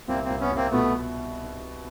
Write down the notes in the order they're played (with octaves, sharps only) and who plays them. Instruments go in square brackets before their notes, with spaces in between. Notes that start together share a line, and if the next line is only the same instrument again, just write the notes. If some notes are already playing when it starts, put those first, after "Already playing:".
[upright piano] C2 [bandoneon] A#3 C4
[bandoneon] A#3 C4
[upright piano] C2
[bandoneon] B3 C#4
[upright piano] C2
[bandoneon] A#3 C4
[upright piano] B2 [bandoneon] A3 B3